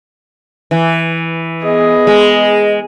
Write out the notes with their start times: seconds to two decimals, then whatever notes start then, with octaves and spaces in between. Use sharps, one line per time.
0.71 E3
1.64 B3 G#4 D#5
2.07 G#3